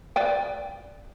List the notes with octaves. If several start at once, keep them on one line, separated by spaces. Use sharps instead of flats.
B4 D5 G5